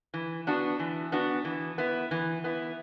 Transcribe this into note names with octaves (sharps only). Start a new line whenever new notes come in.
E3
B3 D4 F#4
E3
B3 D4 F#4
E3
B3 E4
E3
B3 E4